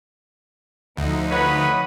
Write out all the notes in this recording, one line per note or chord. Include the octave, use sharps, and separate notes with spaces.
D2 F3 D#4
B4 C#5 F#5 B5 D#6